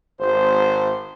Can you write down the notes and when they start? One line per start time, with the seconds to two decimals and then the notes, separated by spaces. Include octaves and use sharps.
0.19 G#1 C5